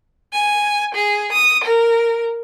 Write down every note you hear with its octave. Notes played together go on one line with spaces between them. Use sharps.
G#5
G#4
D#6
A#4